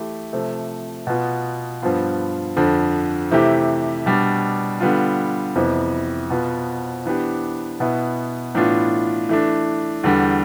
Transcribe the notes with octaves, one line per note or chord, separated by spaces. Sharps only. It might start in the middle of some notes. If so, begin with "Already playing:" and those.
Already playing: E3 A3 E4 G4
C3 F3 A3
B2 B3 F4
G2 F3 B3 F4
F2 D3 F3
C3 E3 A3 E4 G4
B2 G3 D4
D3 G3 B3 F4
F2 C3 E3 B3
B2 B3 F4
E3 B3 D4 G4
B2 B3 E4
A2 E3 B3 D4 F4
E3 A3 D4
E2 D3 G3